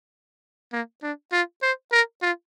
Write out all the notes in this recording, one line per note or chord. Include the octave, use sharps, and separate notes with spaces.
A#3
D4
F4
C5
A#4
F4